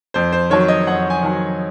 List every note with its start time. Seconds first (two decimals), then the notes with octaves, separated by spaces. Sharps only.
0.14 F2 C5
0.32 C5
0.50 D#3 F#3 C#5
0.68 D#5
0.86 F2 F#5
1.10 G#5
1.23 D#3 F#3